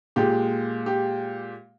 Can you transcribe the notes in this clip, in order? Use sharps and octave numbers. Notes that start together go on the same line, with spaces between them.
A#2 G#3 G4
G4